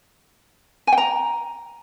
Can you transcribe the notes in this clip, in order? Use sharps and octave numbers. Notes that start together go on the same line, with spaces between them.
G#5
G5
A#5